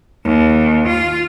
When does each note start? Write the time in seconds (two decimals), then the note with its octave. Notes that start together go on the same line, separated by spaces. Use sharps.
0.24 D#2
0.87 F4